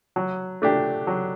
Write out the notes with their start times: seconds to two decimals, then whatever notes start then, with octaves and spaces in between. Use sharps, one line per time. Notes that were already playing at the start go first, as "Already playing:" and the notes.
0.16 F#3
0.62 A3 D4 G4
1.07 F#3